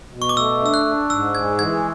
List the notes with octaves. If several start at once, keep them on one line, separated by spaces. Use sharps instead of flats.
B2
C#6
D6
A3 E6
D4 E6
F#6
D4
G#2 E6
G#3 G#6
E3 G#6